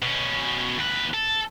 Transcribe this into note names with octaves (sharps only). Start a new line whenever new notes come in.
B2 C#4
D#2 B4
A4